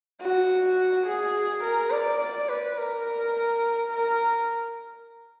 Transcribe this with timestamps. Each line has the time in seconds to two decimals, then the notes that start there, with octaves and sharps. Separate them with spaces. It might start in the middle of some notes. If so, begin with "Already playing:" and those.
0.21 F#4
1.06 G#4
1.64 A#4
1.91 D5
2.20 D5
2.49 B4
2.78 A#4
3.91 A#4